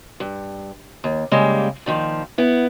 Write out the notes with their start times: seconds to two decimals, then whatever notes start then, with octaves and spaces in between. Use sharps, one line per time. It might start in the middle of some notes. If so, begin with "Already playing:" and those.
0.20 G2
1.04 D#2
1.31 C#3 G3 G#3 A#3
1.86 A#2 D#3 F3
2.38 B3 E4